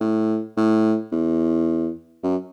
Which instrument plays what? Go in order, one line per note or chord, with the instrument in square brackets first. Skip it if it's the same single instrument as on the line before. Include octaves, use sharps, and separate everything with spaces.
[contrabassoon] A2
A2
E2
F#2